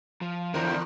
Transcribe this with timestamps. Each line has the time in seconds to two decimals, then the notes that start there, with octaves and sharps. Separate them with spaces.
0.21 F3
0.54 E2 D3 F3 D4 E4 A#4